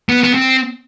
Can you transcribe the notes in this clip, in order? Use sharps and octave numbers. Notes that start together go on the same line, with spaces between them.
B3
B3
C4